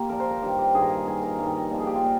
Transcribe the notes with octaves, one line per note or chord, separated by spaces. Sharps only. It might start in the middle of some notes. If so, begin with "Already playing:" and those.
Already playing: A#3 F4 G4
A#2 F3 A#4
C5
A#4
G2 D#3 G4
G4
G2 D#3 G#4
A#4
G#4
G2 D#3 G#4
A#4
G2 D#3
A#2 F3
G#4
G4
F4
A#2